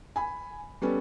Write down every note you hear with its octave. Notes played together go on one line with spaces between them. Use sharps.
G#5 B5
G3 B3 C#4 A4